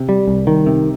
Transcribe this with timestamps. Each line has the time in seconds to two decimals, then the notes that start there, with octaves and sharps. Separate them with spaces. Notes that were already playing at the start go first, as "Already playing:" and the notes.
Already playing: C3
0.09 G3
0.28 C2
0.47 D#3
0.66 C3